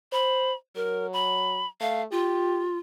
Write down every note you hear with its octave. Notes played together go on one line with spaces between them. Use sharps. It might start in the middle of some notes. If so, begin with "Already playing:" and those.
C5 B5
F#3 A#4
B5
A3 F5
F4 G4